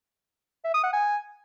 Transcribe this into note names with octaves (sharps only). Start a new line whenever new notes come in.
E5
D#6
F#5
G#5